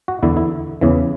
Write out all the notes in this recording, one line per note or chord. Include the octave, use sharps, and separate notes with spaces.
F#4
E2 D3 E4
E4
E2 C#3 E3